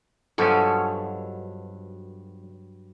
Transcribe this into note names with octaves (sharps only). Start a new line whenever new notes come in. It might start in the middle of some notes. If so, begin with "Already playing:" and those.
G2 B2 F3 F#3 C#4 A4